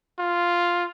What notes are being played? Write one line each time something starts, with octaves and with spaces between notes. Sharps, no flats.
F4